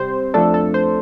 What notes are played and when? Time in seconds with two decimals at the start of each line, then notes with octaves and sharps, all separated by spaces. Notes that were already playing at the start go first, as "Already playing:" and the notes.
Already playing: C3 G3 C4 C5
0.34 F2 F3 A3 D4 A4
0.54 A4
0.74 C5